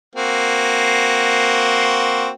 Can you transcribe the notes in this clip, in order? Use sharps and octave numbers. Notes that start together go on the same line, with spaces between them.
A#3 C4 F#4